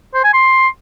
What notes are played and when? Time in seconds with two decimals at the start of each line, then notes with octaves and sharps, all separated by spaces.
0.15 C5
0.24 G#5
0.33 C6